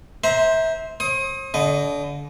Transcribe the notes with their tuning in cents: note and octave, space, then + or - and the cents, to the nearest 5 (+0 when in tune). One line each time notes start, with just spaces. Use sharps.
C5 +0 E5 -25 A#5 +20
C5 +45 D#6 +25
D3 -35 D#5 +0